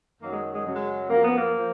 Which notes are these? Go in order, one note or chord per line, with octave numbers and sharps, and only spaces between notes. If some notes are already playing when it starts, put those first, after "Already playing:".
F#2 D#3 F#3 A#3
G#3
G#3
F#2 C#3 F#3
G#3
F#2 F3 A#3
B3
A#3
F3